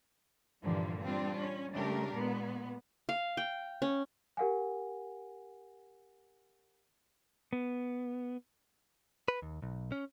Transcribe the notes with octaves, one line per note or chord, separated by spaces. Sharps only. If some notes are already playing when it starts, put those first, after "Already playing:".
G2 A#2 D3 E3 F3 G3
G3 C4 D4 F4
C#4
C#3 G3 A3 D4 G4 A#4
A#2 G#3 B3
F5
G5
C#4
G4 A#4 F5 F#5 G#5
B3
B4
D#2
B1
C#4